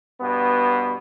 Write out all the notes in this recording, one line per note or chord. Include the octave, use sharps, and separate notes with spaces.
G2 B2 B3